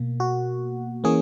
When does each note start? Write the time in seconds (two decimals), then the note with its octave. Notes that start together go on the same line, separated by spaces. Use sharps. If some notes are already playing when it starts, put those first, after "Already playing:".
Already playing: B2 A#3
0.20 F#4
1.04 E3 A#3 C#4 G#4